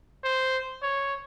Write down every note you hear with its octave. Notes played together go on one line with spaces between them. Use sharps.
C5
C#5